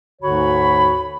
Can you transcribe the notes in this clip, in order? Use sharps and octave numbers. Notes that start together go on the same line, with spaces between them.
D2 G#2 D3 F#4 C#5 B5